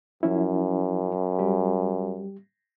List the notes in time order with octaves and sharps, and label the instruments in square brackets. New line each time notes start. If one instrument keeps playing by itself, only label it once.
[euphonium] F#2 [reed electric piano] F3 C#4 E4
[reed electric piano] G3 G4